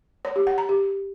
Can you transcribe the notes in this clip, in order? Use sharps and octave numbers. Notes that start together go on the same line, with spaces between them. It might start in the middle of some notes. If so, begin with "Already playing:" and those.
C#5
G4
F#5
A#5
G4